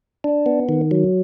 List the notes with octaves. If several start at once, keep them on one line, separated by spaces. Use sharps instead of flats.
D4
B3
D#3
F#3